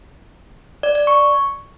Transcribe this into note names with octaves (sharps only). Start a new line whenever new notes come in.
D5
D5
C#6